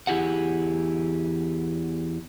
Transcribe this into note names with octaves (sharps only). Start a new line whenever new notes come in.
E2 E4 G4 G#4 F#5